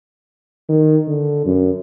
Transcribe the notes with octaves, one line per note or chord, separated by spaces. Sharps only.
D#3
D3
F#2